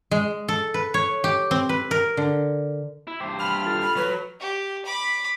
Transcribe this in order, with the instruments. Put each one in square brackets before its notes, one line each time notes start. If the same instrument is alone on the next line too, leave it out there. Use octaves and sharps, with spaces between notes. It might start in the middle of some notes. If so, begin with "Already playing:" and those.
[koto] G#3
A4
B4
C#5
G4
C4
B4
A#4
D3
[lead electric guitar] E4
[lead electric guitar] G2 C5 [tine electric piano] G5 D6
[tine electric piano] F5 [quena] B5 [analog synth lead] F6
[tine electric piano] F4 A4 A6
[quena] B5
[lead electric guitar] F#3 [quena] B4
[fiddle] G4
B5 D6